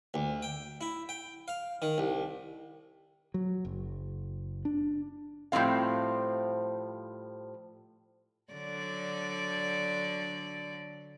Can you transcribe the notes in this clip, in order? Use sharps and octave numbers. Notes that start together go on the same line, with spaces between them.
D2
G5
E4
G5
F5
D#3
C2
F#3
F#1
D4
A2 F3 G3 C4 F5
D3 F#3 D5